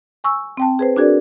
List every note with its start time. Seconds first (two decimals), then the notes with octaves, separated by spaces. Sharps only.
0.24 G#5 C#6 E6
0.57 C4 G5 A5
0.79 G#4 B4 C5
0.96 D4 F#4 G#4 A#4 D5